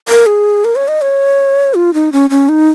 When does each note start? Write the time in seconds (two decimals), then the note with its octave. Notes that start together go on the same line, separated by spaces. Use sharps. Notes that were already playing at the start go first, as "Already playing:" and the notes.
0.09 A#4
0.26 G#4
0.64 A#4
0.76 C#5
0.88 D#5
1.01 C#5
1.74 F4
1.94 D#4
2.12 C#4
2.30 C#4
2.49 D#4